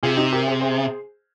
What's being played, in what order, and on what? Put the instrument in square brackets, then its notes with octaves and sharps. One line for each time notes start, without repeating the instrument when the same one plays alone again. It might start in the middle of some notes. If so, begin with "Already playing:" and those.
[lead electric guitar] C3 [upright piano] F4 G#4
[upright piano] D#4 G4
G4 A#4
G#4 C5
G#4 C5